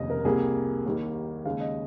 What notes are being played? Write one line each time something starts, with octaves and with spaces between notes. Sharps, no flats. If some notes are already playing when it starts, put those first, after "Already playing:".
Already playing: F1 D#2 C#3 D#5
A#4
C2 C3 G3 A#3 G#4
D#2 D#3 G3 A#3
D#2 C#3 G#3 F5
D#5